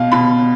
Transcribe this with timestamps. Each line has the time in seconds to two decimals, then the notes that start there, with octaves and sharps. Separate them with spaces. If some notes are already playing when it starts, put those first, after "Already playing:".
Already playing: B2 F5
0.12 B2 B5